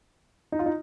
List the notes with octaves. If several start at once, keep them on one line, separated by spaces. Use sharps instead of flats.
D#4
F4
D#4